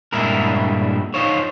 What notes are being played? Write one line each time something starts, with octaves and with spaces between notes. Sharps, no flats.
G2 A#2 G3 G#3 E4 A#4
D#4 F4 C5 C#5